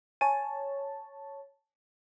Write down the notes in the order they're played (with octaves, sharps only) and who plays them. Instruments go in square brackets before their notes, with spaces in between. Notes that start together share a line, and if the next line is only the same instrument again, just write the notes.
[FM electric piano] C#5 A5 [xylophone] G#5